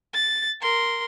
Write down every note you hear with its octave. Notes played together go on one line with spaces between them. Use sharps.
A6
A#4 C6